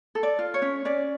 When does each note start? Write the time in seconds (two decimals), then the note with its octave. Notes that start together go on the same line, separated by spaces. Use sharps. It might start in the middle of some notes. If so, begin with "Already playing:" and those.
0.15 A4
0.23 D5
0.39 F4
0.54 C#5
0.62 C#4
0.85 C#4 D5